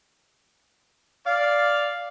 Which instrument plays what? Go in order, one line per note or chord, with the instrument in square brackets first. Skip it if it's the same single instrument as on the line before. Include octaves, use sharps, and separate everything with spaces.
[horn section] D5 F5